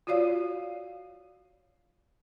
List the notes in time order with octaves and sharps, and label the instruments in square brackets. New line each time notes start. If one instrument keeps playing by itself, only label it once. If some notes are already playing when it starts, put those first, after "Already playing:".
[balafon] F4 F#4 C#5 D5 F5